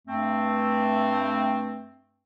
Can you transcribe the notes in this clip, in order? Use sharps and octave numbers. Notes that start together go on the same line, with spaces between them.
G2 A3 C4